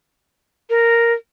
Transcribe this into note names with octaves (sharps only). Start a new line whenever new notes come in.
A#4